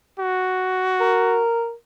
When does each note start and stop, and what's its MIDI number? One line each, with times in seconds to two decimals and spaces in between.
0.19 1.44 66
1.00 1.72 70